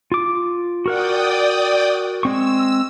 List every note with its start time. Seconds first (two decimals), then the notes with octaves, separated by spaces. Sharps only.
0.12 F4 D6
0.86 F#4 A#4 D5 F#5 G5 D#6
2.23 G#3 C4 C#6 E6